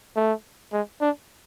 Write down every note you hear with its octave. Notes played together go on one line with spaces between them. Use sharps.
A3
G#3
D4